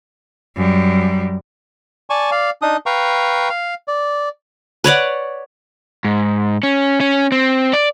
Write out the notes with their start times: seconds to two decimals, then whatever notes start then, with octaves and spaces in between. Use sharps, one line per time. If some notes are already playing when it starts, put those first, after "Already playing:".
0.57 F#2 G3
2.10 D5 G#5 A5 C#6
2.31 D5 F5
2.62 D4 D#4 D#6
2.86 B4 F5 G5 A#5 C#6
3.49 F5
3.88 D5
4.84 B4 C#5 D5 F#5
6.05 G#2
6.63 C#4
7.01 C#4
7.32 C4
7.73 D5